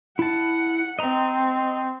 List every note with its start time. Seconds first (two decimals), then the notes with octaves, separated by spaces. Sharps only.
0.19 E4 F#5 A5
0.99 C4 D#5 A#5